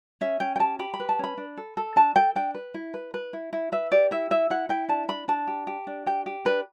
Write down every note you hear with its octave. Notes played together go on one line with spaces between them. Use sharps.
C#4 E5
C#4 G5
G5
G4 A5
G4 B5
B5
B4
A5
C#4 B5
D4
A4
A4
D4 A5
A4 G5
D4 G5
B4
E4
B4
B4
E4
E4
B4 E5
G4 D5
E4 E5
E4 E5
E4 F#5
E4 G5
D4 A5
D4 B5
D4 A5
G4
G4
D4
G4 G5
G4
D4 B4